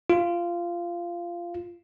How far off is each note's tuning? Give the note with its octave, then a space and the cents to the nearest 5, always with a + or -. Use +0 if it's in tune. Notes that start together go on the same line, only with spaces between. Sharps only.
F4 -15